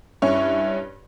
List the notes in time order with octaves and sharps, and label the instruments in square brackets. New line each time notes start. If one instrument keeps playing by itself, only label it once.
[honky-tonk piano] G2 C#4 C#6 [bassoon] E4